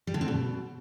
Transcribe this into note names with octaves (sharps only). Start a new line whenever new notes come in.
G3
D3
C4
B2